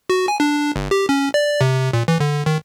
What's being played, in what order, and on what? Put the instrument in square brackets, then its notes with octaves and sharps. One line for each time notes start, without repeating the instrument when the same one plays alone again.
[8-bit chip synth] F#4
G#5
D4
G1
G4
C#4
D5
C3
A#2
E3
D3
D#3